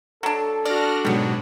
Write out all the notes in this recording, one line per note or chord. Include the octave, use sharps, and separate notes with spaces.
F#3 D4 A4
D4 F#4 D5 F6 A#6
G#2 B2 F#3 G3 B3